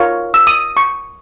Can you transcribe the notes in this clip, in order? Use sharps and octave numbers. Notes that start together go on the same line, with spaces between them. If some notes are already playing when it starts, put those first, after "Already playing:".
Already playing: F4 A#4 C#5
E6
D#6
C#6